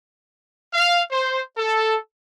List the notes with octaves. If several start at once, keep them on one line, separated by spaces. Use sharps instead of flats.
F5
C5
A4